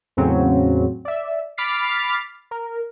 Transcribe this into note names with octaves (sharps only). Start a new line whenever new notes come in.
E2 A2 C#3 F#3 C4 C#4
D5 E5
B5 D6 F6 A6 B6 C7
A#4